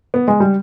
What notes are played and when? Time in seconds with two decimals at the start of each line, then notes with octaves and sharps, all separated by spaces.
0.14 B3
0.28 G#3
0.40 G3